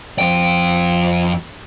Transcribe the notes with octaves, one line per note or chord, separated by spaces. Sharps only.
F2 G5